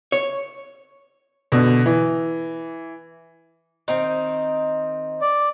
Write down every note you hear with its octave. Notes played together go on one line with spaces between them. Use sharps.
C#5
B2 D3
E3
D#3 C4 D#4
D5